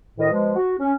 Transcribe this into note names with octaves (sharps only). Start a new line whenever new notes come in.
D2 A2 D#3 D#5
B2 F3 G#3
F#4
C#4